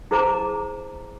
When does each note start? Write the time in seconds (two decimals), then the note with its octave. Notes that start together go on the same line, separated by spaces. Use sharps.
0.11 E4 G#4 C5 A5 A#5 D6